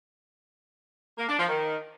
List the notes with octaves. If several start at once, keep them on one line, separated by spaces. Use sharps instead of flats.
A#3
D4
F3
D#3